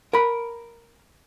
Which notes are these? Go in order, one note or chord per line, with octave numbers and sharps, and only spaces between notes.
A#4 B5